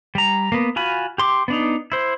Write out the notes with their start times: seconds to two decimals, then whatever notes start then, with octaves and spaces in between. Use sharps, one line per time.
0.15 G3 A#5
0.52 A#3 B3
0.76 F4 F#4 G#5 B5
1.18 G4 C6 D6
1.48 B3 D4 D#4
1.92 E4 C5